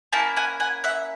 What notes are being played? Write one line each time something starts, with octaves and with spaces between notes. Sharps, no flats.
A#3 C#4 E4 G5 A5
F#5 G#5
F#5 G#5
E5 F#5